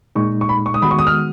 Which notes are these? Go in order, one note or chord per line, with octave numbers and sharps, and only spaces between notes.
A#2 G#3 D#4 C#6
C#6
B5
C#6
D#6
D#3 G#3 B3 F#4 B5
C#6
D#6
F6